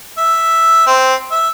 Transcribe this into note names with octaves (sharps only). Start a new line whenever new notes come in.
E5
C4
E5